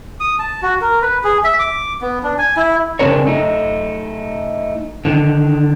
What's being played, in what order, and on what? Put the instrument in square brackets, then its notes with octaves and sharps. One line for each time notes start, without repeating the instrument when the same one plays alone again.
[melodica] D#6
A5
F#4
A#4
B4
G#4
E5
D6
B3
D4
G#5
E4
[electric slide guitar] C#3 F#3 C4 D4 A#4 C#5
A3 D#4
D3 D#3